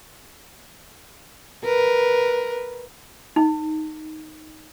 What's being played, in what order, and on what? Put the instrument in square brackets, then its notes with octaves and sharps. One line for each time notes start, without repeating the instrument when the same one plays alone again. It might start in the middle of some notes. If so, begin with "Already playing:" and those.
[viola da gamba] A#4 B4
[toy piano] D#4